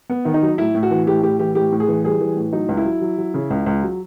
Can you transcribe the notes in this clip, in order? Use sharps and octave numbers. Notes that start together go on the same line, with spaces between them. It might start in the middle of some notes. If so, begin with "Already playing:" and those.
B3
D#3
D#4
F#3
A2 E4
A2
F#4
E3
A2 G4
A2 G4
E3 G4
A2 G4
A2
G#4
E3
G3 G#4
E3
A2
F#3 D#4
C#2
E4
F#3
F#3
F#3
C#3
C#2
C#2
F#3